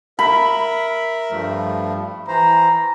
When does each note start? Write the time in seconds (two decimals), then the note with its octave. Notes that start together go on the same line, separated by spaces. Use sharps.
0.19 A#4 E5 B5
1.31 G2 F3 A3
2.28 E3 C5 A#5